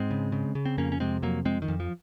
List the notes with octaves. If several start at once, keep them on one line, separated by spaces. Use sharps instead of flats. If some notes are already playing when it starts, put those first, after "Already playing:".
Already playing: G#2 G#3 C4
C#3
C#3
C#3
C4
F2 A#3 C#4
C#4
C3 G#3 C4
F2 F#3 A#3
F2 G#3 C4
D#3
F2
F3